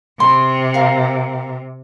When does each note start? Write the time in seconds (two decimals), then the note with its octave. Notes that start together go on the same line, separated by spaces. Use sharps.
0.20 C3 C6
0.74 A#4 F5